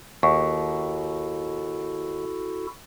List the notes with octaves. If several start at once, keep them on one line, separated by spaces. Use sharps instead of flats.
D#2 E4 F#4 A4 C#6